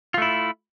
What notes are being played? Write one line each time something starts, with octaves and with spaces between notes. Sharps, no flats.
A3 E4 F4